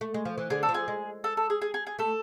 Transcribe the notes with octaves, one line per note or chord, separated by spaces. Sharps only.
A3
G#3
F3
E3
D3 G#4
A4
F3
G#4
G#3
A4
A4
G#4
G#4
G#4
G#4
A3 A4